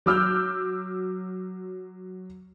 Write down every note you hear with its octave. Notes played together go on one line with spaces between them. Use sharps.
F#3 D6 E6 F6 G6